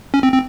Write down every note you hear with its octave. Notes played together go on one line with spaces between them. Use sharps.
C#4
C4
C4